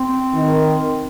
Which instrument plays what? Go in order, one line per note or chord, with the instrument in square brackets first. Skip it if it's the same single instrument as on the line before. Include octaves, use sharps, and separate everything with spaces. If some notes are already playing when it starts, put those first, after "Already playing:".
Already playing: [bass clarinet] C4
[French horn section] D#3